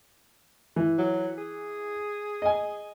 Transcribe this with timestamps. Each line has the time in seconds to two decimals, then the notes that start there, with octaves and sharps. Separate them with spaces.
0.76 E3
0.98 F#3
1.38 G#4
2.42 D#5 G#5